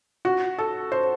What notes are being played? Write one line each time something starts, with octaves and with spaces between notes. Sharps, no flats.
F#4
A4
C5